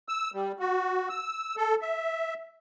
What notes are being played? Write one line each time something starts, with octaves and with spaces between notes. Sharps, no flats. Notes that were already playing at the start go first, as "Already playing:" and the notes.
E6
G3
F#4
E6
A4
E5